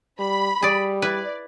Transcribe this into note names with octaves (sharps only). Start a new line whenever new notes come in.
G3 B5
G3 G#4 D5
E4 B4 D5